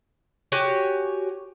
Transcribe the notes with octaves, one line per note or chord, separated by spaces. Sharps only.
F#4 G4 C#5 G#5